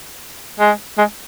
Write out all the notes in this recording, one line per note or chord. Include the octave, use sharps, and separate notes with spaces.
G#3
G#3